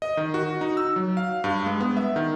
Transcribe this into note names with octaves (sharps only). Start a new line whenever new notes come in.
D#5
D#3
F#4
D#4
E6
F#3
F5
G2
G#3
B3
E5
D#3